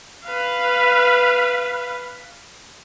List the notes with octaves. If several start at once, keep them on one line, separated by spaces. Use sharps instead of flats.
B4 F5